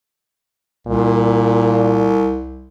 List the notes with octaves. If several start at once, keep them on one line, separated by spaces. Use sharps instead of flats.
C2 A#2